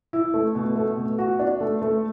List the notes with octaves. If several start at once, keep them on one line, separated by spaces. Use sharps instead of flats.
E4
A3
B2
A3
B2
F#4
D4
A3
A3